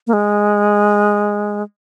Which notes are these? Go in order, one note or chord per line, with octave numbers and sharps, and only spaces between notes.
A#3
G#3